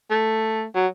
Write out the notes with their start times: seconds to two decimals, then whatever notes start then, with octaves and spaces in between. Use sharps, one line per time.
0.11 A3
0.75 F#3